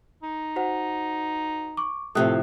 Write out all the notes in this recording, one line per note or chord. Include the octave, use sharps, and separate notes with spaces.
D#4
F#4 C5 F#5
C#6 D6
A2 C3 F3 A4 D#6 F#6